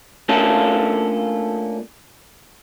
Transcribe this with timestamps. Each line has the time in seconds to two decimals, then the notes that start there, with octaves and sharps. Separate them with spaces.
0.29 A3 A#3 C#4 D4 F4 A4